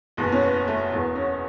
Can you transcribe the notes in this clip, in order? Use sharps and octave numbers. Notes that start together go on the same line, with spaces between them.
F#1 E2 B2 B3
C#4
B3
A3
E1 E2 B2
C#4